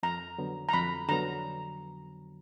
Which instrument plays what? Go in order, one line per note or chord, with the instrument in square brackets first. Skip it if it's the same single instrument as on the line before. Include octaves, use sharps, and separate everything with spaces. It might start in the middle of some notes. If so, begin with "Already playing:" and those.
[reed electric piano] F2 [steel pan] A#5
[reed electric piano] D3 F#3 B3
[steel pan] A#5
[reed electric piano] F2 [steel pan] B5
[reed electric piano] D3 F#3 B3 [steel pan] A#5